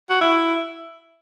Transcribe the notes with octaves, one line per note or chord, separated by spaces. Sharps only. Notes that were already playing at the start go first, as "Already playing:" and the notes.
F#4
E4